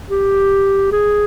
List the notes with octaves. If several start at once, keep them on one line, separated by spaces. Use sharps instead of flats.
G4
G#4